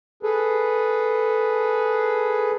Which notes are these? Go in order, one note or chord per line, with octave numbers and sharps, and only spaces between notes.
G#4 A4 B4